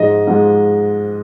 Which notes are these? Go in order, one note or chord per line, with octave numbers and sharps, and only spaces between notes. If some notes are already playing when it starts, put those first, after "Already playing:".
Already playing: G#2 F3 G#3 D#5
G#2 F3 G#3